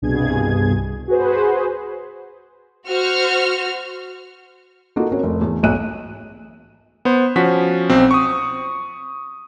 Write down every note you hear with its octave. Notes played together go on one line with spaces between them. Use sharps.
C2 G2 B2 G#4 G#6
F#4 G#4 B4 C5
F#4 C5 F6
A#3 D#4 F4 F#4 A4
C4 C#4 F#4 A#4 C#5
F1
E2
B1 F#6 D#7
B3 C5
F3 C#4 F#4 B6
B1 C4
C#6 D#6